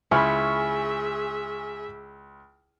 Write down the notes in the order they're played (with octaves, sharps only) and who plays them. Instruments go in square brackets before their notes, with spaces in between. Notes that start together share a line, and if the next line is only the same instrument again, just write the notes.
[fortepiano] C#2 B5 [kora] E4 [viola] G#4 E5 [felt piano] G#5 C#6 F6